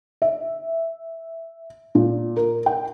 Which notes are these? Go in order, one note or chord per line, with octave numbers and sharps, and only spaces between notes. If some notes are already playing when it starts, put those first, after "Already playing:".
E5
A#2
A#4
G5